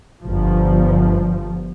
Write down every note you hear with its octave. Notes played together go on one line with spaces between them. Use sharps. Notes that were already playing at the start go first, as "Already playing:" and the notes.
G1 F3